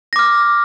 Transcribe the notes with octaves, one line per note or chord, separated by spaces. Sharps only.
D6 F6 A#6